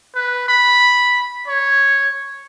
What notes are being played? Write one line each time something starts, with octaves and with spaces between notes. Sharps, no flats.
B4
B5
C#5